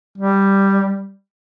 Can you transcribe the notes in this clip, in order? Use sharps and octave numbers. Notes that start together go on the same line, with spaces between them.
G3